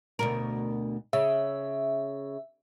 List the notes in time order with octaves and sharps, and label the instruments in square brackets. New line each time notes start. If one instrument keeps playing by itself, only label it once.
[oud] D2 B2 A#4
[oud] C#3 [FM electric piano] E5